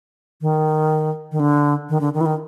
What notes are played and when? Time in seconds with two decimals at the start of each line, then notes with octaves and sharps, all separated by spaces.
0.41 D#3
1.32 D#3
1.40 D3
1.89 D#3
2.01 D3
2.14 D#3
2.21 E3
2.26 D#3